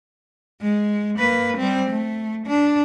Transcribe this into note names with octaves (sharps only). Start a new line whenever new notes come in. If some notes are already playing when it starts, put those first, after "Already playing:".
G#3
A#3 B4
G3 C4
A3
D4